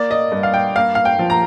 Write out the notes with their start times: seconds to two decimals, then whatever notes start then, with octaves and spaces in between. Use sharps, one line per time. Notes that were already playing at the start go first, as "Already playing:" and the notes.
Already playing: A#3 D5
0.11 D#5
0.32 G2
0.43 F5
0.54 G5
0.76 A#3 F5
0.95 F5
1.05 G5
1.19 F3
1.30 A#5